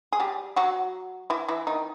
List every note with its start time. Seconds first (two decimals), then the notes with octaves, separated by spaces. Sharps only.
0.12 G#4
0.20 G3 G4
0.56 F#3 F#4
1.30 E3 E4
1.48 E3 E4
1.67 D#3 D#4